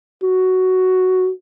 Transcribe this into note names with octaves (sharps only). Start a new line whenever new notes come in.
F#4